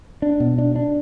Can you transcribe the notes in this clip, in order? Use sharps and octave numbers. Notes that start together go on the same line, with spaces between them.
D4
B2
D4
D4